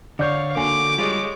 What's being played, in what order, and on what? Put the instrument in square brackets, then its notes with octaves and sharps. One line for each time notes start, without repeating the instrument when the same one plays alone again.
[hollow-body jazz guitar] D3 [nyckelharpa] C#5 F5 [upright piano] D5 G6
[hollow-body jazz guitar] D3 A#3 [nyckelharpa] F#4 [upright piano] G#5 [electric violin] D6
[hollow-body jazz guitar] G3 F4 [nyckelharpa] G#3 C#5